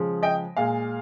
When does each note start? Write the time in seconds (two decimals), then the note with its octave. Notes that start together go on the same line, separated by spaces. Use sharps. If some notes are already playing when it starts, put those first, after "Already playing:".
Already playing: C#3 F3 G#3
0.23 D#5 G5
0.57 A#2 G#3 F5 G#5